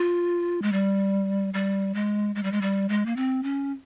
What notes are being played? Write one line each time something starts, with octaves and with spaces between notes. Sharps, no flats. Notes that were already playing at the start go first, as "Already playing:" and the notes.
Already playing: F4
G#3
G3
G3
G#3
G#3
G3
G#3
G3
G#3
A#3
C4
C#4